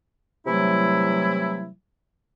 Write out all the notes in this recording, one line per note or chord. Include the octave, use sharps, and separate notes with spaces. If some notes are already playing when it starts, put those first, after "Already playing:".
C3 E3 F#3 G3 A3 E4